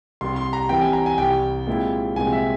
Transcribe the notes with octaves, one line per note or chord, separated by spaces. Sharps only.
C2 C3 G3 C6
C6
A#5
C3 E3 G3 C4 E4 G5
G#5
A#5
G#5
C2 C3 G3 G5
A#2 G#3 C4 E4
C2 A#2 G#3 C4 G#5
E5